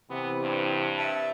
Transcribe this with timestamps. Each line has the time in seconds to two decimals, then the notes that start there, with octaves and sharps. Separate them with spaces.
0.10 C3 E3 B3
0.42 G2
0.98 E5 A5